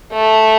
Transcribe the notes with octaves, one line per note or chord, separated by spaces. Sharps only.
A3